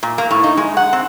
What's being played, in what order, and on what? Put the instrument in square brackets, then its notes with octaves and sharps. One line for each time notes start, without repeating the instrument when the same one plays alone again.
[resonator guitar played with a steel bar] A#2
A#3
A2
D#4
G#3
F#5
C4